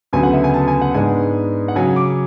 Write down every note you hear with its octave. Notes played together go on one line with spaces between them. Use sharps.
D2 C#3 F#3 B3 G#5
F#5
E5
G#5
A5
G#5
F#5
G#2 G#3 B3 D4 G#5
F#5
C#3 F#3 C#4 G#5
D6